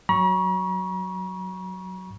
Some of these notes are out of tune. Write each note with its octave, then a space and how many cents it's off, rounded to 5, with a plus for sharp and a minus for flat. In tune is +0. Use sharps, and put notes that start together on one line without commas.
F#3 +0 A#5 +45 C#6 +0